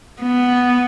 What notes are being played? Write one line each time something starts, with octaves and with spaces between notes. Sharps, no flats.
B3